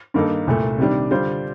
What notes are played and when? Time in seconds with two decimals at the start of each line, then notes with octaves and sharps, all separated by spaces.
0.14 G2 D#3 A#3 D#4 A4
0.47 C2 A#2 A3
0.78 C3 D#3 G3 D4
1.11 D3 G3 D4 F4 C5